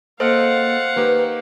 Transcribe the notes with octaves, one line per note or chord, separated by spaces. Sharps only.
A#3 A4 C5 D#5 F5 F#5 F6
D#3 A#3 G4 B4